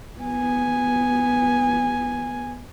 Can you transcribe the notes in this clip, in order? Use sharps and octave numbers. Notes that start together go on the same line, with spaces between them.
B3 G#5